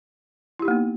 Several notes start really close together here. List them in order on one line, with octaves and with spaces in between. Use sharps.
E4 G4 D#4 A#3 B3